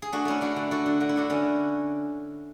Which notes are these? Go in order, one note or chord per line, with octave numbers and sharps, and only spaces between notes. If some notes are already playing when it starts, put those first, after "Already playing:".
G#4
A3 D4 F#4
A3 C#4 E4
A3 D4 F#4
D3
D3 F#4 A4
D3
D3 F#4
E4
A3 D4 F#4
D3 C#4